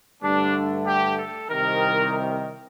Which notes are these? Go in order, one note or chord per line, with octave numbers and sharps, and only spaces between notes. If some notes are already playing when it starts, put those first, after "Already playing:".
G2 D3 A3 D4
G4
A4
C2 C3 D#3 A#4